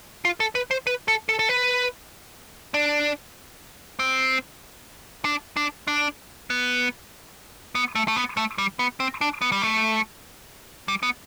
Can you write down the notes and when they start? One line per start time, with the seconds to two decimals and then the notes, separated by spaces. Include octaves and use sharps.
0.25 F4
0.40 A4
0.55 B4
0.71 C5
0.87 B4
1.08 A4
1.29 A4
1.39 A4
1.49 B4
2.74 D4
3.99 C4
5.25 D4
5.57 D4
5.88 D4
6.50 B3
7.75 B3
7.95 A3
8.08 A3
8.16 B3
8.37 A3
8.58 G3
8.79 B3
9.00 C4
9.21 D4
9.42 B3
9.52 G3
9.62 A3
10.88 G3
11.03 B3